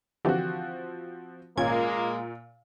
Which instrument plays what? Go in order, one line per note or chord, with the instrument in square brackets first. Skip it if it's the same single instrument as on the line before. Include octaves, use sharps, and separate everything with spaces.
[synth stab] D3 E3 G4 [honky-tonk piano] F3 C4 F#4
[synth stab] G#1 C#4 G#6 [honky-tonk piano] A#2 [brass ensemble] G#3 A#3